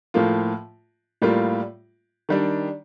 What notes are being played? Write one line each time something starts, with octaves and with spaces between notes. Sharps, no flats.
A2 F3 A#3 F4
A2 G3 A#3 F4
D#3 G3 D4